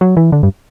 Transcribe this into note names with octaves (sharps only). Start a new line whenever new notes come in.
F#3
E3
D3
G2